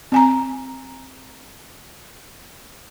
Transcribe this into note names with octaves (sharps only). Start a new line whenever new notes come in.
C4 G#5 A#5